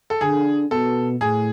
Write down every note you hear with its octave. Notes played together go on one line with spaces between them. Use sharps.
A4
D3 G#4
B2 A4
A2 G#4